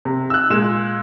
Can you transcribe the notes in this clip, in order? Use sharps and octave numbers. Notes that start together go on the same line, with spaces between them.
C3
E6 F#6
A#2 G#3 E7